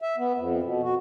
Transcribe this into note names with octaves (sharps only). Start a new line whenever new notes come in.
E5
B3
F2
B2
F#4